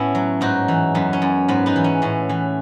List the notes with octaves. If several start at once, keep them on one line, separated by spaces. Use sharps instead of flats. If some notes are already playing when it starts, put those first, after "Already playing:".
Already playing: A2 B3 C#4 E4
F#3
G#2 D#4 F#4
E3
F#2 B3
C#4
F#2
G#2 B3
B3 D#4
E3
C#4
A2 C#4
E3